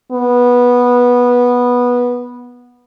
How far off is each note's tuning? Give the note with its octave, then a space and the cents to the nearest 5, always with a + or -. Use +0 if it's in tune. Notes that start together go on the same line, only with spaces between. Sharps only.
B3 -10